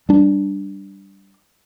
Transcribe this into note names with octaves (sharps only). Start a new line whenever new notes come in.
G3 D4